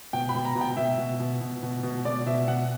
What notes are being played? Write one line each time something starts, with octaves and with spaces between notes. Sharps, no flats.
B2 G5
B5
B2
A#5
B2
G5
B2 E5
B2
B2
B2
B2
B2
B2 D5
B2 E5
B2 F#5